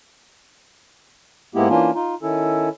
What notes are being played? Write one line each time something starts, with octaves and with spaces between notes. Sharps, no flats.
G#2 G#3 A#3 B3 E4 G4
E3 A#3 C#4 D4 F4
D#4 F4
D#3 C#4 E4 A4